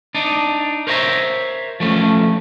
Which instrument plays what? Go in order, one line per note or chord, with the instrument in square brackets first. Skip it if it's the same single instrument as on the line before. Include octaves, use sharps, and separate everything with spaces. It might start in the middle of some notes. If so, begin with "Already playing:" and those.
[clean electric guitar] D4 D#4
A#4 C5 C#5 E5 A#5
F3 A3 C#4